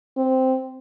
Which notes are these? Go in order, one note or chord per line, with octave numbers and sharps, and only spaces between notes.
C4